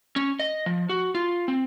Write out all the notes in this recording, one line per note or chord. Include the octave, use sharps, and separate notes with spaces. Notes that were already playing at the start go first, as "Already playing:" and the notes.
C#4
D#5
F3
F#4
F4
C4